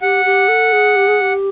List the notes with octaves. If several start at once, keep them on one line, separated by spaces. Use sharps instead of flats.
G4 F#5
G4
A4
G#4
G4
G#4
G4